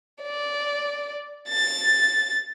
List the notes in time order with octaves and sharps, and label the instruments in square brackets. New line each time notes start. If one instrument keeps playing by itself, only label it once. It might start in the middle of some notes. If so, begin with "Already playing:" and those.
[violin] D5
A6